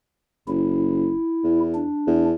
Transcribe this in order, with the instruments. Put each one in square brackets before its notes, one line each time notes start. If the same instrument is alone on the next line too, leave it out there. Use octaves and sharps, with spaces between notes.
[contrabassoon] F#1 [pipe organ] E4
[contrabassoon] E2
[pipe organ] D4
[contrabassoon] E2